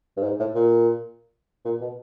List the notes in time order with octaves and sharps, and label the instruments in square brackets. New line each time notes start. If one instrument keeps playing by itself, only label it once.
[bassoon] G2
G#2
A2
A#2
A#2
B2